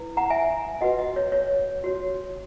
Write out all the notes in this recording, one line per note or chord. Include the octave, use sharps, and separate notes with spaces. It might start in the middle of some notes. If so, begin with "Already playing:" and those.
Already playing: E4 B4
F#5 A#5
E5 G#5
F#4 B4 D#5 F#5
D#5
C#5
C#5
F#4 C#5